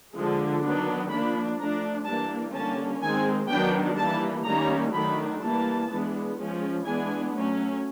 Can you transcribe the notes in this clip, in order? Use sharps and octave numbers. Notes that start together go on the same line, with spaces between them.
D3 F3 G#3
D#3 F#3 B3 D4
F3 A#3 D4 B5
F3 A3 D4 A#5
E3 G3 A#3 D4 A5
D3 G3 A#3 C#4 A5
D#3 G#3 C4 G#5
D#3 F#3 B3 D4 G5
E3 G3 A#3 A5
D#3 G3 A#3 C#4 A#5
D#3 F#3 A3 D4 B5
E3 G3 A#3 A5
E3 G#3 B3 D4
F3 G#3 C#4
E3 G#3 B3 D4 G#5
F#3 A3 C#4